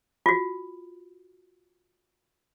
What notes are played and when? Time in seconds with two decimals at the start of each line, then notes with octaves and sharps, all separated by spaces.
0.26 F4 F#4